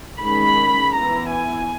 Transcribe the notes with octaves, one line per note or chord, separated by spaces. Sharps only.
D#3 G#3 C#4 B5
E3 B3 E4 A#5
G#5